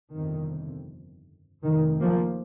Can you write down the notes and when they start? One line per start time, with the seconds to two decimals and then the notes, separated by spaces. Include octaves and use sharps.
0.13 G1 F2 C3 D#3
1.63 F1 F2 C3 D#3
2.01 F3 A#3